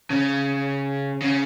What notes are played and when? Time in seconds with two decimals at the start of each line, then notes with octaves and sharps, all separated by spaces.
0.10 C#3
1.22 C#3